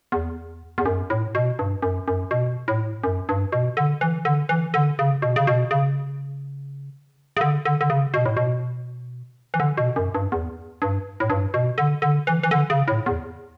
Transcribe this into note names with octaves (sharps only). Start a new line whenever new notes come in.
E2
E2
F#2
A2
B2
G2
F#2
F#2
B2
A2
F#2
G2
B2
D3
E3
D3
E3
D3
C#3
B2
C#3
B2
C#3
C#3
D3
D3
D3
C#3
B2
A2
B2
E3
D3
B2
F#2
G2
E2
G2
A2
G2
B2
D3
D3
E3
E3
D3
C#3
A2
E2